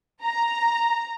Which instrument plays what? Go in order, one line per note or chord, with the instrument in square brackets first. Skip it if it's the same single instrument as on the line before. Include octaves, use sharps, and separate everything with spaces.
[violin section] A#5